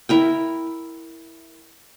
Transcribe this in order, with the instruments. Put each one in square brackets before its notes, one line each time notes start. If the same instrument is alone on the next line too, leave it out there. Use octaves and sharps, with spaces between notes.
[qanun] E4 A#4 G5